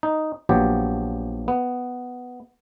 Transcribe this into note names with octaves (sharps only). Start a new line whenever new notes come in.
D#4
A#1 F3 F#3 B3 G4
B3